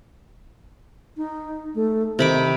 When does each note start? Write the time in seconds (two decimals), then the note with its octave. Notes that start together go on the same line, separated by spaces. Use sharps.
1.17 D#4
1.75 A3
2.19 C3 D#3 B5 D6